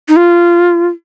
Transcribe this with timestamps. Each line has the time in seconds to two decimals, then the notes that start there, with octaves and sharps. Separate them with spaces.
0.09 D#4
0.16 F4